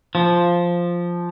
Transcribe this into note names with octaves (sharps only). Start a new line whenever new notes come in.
F3